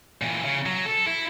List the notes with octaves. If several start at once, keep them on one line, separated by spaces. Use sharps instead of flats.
A#2 E3
C#3
F#3
A4
E4